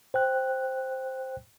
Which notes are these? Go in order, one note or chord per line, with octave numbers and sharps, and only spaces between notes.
C5 G5 F#6